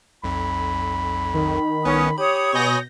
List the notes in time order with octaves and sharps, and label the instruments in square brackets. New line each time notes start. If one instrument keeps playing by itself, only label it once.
[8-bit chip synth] B1 F2 [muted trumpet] B5
[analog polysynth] D#3
[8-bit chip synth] C2 B3 B4 [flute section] C#4 D#6
[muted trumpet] G4 [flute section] C#5 D#6 [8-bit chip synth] B5
[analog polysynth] B2 G6 A#6 [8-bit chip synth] G#5 B5 C#6